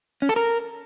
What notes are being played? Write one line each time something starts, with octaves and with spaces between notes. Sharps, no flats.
C#4
A4
A#4